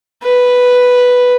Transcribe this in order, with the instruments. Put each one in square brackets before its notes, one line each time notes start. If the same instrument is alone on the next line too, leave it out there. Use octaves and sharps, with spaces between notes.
[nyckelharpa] B4